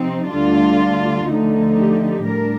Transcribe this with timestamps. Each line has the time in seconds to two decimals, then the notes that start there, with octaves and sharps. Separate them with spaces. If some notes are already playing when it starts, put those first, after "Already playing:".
Already playing: C3 F3 C4 D#4
0.29 D2 D3 G3 D4 F4
1.27 D2 D3 F3 A3 D#4
1.77 G4
2.25 A2 G3 D4 A#4